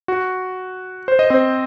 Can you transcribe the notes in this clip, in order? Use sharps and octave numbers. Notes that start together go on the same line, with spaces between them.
F#4
C5
D#5
C4 C5